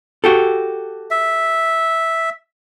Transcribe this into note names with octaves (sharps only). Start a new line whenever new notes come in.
F#4 G4 A4
E5